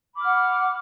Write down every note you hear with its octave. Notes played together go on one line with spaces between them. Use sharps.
F#5 B5 D6 F6